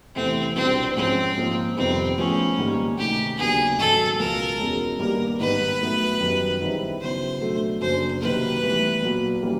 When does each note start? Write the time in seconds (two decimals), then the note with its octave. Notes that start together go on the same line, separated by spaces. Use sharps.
0.15 E2 C3 E3 A3 C4
0.56 C2 B2 G#3 B3 C4 D4
0.96 G#2 F3 G#3 C4 C#4
1.37 G#2 F3 A#3
1.77 F2 C3 D#3 G3 B3 C4
2.17 A2 F3 G#3 B3 C#4
2.57 G#2 D#3 G3 A#3
2.98 D2 C3 D#3 G4
3.38 D#2 C#3 F#3 B3 D4 G#4
3.78 G#2 D#3 F#3 A4
4.19 C#2 B2 F#3 A#4
4.59 E2 B2 G#3 C#4
4.99 G2 D#3 G3 A#3 A#4
5.39 G#2 D#3 G3 B3 B4
5.80 A2 F#3 B3 E4
6.20 F#2 D#3 G3 B3
6.60 G2 D#3 G#3 C4 E4
7.01 C#3 F#3 B3 E4 C5
7.41 B2 F#3 A3 D4
7.81 F#2 C#3 F#3 A#3 D4 C5
8.21 C3 D#3 F#3 A#3 B4
8.62 A2 E3 G3 B3
9.03 A#2 F#3 B3
9.43 E3 G3 A#3 C#4